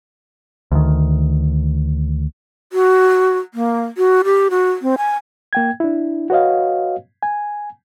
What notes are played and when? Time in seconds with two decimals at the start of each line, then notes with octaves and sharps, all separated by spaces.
0.72 D2 D#3
2.73 F#4
3.54 A#3
3.97 F#4
4.24 G4
4.50 F#4
4.82 C4
4.98 G#5
5.53 A#3 G5 G#6
5.80 D4 E4
6.30 F#4 B4 C#5 D#5 F5
7.23 G#5